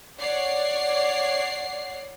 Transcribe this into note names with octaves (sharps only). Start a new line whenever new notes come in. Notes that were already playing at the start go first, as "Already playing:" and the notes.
C#5 D5 F#5 C7